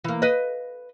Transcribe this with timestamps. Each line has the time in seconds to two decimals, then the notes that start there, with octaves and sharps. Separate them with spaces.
0.04 E3 A#3
0.22 B4 D#5